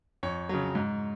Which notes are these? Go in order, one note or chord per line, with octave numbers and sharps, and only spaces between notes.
F2 C#5
C#3 F#3
G#2